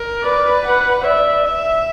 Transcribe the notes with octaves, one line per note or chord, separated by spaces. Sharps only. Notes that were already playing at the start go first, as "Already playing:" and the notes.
Already playing: A#4
B4 D5
F#5
D5 E5
E5